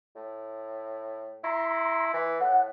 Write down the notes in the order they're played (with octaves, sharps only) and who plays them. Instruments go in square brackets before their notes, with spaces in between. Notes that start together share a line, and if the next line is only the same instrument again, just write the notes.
[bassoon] A2
[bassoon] E4 [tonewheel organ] A#5 C6
[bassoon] E3
[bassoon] A2 [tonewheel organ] F#5